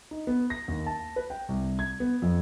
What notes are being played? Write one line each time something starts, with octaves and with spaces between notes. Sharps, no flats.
D#4
B3
A#6
D#2
A5
B4
G5
C2
G#6
B3
F2